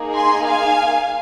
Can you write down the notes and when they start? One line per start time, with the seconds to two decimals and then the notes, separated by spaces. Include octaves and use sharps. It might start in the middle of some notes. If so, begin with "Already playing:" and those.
Already playing: A#3 D#4 G#4
0.14 G#5 C6
0.45 F5 G#5